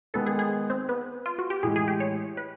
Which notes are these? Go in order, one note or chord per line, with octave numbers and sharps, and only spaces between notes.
D#3 G#3 B3 D#4 A4
G#4
G#4
C4
B3
F4
F#4
G4
A2 E3 G#3 G#4
G#4
G4
C#5
B4